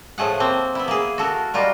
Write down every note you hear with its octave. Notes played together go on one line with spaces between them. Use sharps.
A2 F3 A3 G#4 F#5
A#3 C4
B3 E4
A#3 G#4
F#4 A4 A#4
G3 D#4 F4 F#4 A#4